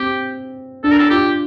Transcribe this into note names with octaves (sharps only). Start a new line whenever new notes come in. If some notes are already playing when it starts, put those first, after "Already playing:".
Already playing: C4 G4
D4 A4
A#4
A4
F4 G4